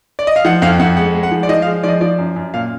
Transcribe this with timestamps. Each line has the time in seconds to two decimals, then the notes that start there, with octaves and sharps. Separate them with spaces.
0.19 D5
0.27 D#5
0.36 F5
0.45 F3 F#5
0.62 F2 F5
0.79 F2 F#5
0.97 G#3 F#5
1.15 G#3
1.23 F#5
1.32 F3
1.43 D5
1.49 F3 D#5
1.62 F5
1.66 G#3
1.83 F3 D5 D#5
2.01 F3 D5
2.18 F#2
2.36 F#2
2.54 A#2 F5